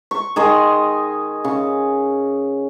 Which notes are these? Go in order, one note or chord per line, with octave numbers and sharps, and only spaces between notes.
C#6
D#3 G#4 D#5 C6
C#3